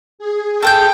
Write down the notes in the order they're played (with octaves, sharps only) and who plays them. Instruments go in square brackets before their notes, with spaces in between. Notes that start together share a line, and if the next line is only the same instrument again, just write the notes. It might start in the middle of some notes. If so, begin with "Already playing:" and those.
[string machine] G#4
[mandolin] A4 C5 G6 [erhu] G5